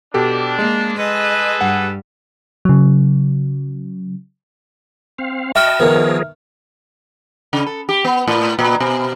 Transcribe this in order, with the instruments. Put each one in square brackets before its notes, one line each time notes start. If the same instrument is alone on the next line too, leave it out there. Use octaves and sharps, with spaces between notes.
[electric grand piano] B2 G4 A4 [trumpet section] D4
[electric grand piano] G#3 [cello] A#3
[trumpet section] G#4 A4 B4 [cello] D#5
[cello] G2 G3 [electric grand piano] F#5
[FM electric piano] C#3 F#3
[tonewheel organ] C4 F5
[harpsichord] F#4 G5 B5 [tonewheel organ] D#5 A5 [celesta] E5 F6
[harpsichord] B2 D#3 [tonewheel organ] F3 G#4 A#4
[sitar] C#3
A4
G4
B3
A2
A#2
B2